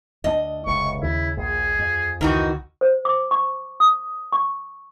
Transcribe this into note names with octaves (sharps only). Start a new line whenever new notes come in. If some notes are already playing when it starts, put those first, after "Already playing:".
D2 G3 D4 D#5
F1 C#2 C3 C#6
D#2 C#3 E4
A#1 G#4
F2
C#2 D#3 E3 D#4 F#4
C5
D6
C#6
D#6
C#6